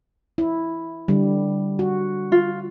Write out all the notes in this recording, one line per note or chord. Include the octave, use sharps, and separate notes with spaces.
E4
D3 G3
F#4
F4